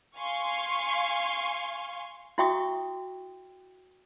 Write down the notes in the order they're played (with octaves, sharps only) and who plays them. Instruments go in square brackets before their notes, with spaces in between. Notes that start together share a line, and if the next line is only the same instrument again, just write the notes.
[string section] F5 G#5 C6 C#6
[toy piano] E4 F#4 E5 G5 C#6 D#6